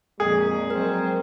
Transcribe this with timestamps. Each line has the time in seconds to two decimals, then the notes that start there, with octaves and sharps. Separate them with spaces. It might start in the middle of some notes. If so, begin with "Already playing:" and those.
0.20 F2 A#2 G#3 G#4
0.70 F#3 C4 A#4